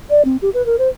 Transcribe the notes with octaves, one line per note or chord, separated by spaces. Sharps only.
D5
C4
G4
B4
A#4
C5